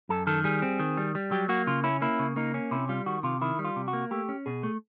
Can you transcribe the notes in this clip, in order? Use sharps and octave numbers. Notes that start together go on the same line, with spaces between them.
F#2 A4
D#3 A4
G3 G#4
C4
D#3
G3
G3
F#3 G4
A#3 F#4
C#3 F4
C#4 E4
A#3 E4
C#3
A#3 D#4
C#4
C3 E4
G3 F4
D#3 F#4
C3 F4
D#3 E4
G3
F4
C3
F#4
A#3
A3 G4
C#4
B2 G#4
A3